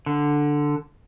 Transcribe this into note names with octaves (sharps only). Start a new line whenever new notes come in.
D3